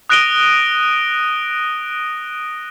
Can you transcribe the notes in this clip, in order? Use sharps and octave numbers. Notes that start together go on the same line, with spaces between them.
D#6 F#6 A#6 D7 D#7 G7